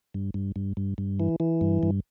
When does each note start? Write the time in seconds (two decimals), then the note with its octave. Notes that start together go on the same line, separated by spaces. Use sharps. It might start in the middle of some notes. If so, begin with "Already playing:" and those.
0.14 G2
0.34 G2
0.56 G2
0.77 G2
0.98 G2
1.20 E3
1.40 E3
1.61 G2
1.83 G2